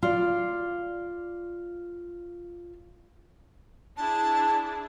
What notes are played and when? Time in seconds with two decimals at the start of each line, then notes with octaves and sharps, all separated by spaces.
0.03 F4 D5
3.97 D4 E4 G#4 A5